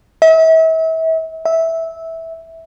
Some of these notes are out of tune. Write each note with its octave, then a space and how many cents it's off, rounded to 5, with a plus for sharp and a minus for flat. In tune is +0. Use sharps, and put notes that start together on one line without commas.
E5 -35
E5 -15